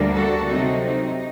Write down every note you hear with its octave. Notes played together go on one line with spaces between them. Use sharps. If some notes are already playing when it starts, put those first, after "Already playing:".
Already playing: D2 D3 G3 A#3 D4
F#4 A4
C3 F#3 C4 D#4
D#4